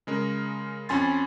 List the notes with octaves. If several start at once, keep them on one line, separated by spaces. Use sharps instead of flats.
C#3 G#3 A#4
F2 C#4 G#5 B5 C6 A6